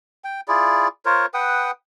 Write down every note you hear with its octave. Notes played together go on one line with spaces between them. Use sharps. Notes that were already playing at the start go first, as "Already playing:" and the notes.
G5
E4 F4 G#4 D5
F4 A#4 C5 C#5
B4 F#5 G5 D#6